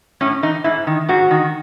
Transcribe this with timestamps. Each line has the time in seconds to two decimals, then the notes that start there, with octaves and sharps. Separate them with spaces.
0.21 A2 C#4
0.42 E3 D#4
0.64 G#2 E4
0.87 D#3
1.08 G#2 F#4
1.31 D#3